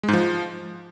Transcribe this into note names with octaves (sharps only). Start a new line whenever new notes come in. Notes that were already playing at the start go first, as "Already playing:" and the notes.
G#3
G#2
F3